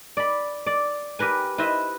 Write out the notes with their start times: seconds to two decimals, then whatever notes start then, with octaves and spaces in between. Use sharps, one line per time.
0.17 D5 B5
0.67 D5
1.19 G4 A#4 B4 G#5
1.58 E4 B4 C5 D#5 E5